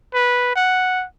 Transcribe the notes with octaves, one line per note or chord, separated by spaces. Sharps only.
B4
F#5